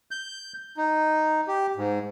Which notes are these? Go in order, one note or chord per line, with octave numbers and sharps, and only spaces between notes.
G6
D#4
G4
G#2